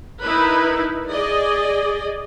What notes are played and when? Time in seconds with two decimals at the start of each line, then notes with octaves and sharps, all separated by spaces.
0.23 D#4 E4 A#4 B4
1.11 G#4 D5 D#5